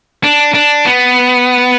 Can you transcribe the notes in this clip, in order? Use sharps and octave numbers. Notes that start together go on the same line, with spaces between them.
D4
D4
B3